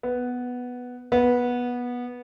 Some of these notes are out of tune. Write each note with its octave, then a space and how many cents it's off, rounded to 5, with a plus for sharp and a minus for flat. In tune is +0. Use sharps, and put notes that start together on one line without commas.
B3 +0
B3 -15